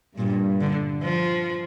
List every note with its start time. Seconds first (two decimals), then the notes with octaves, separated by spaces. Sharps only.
0.17 G2 A#2
0.60 D3
1.03 F3